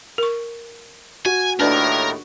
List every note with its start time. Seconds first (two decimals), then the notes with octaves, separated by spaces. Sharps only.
0.18 A#4 C#6
1.26 F#4 G#5
1.60 D#2 A2 D4 A#4 B4 D5